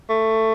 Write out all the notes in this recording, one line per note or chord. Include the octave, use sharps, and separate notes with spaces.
A3